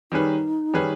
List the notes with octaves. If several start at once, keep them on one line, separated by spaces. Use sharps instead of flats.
D#3 G3 C#4 D#4 G#4 B4
D#3 G3 C#4 G#4 B4